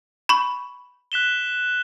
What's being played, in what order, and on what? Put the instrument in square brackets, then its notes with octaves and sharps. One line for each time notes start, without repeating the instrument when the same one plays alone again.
[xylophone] B5 C#6
[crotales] F#6 B6 E7 G7